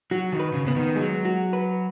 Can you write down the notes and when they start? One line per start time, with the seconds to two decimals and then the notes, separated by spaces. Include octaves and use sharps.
0.11 F#3 F#4
0.33 D#3
0.40 B4
0.53 C#3
0.66 C#3 B3
0.76 D#3
0.96 F#3 G#3
1.25 F#4
1.53 B4